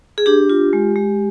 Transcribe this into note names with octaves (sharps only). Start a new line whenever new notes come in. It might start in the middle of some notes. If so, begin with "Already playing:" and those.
G#4
D4 G4
F4
G#3
G#3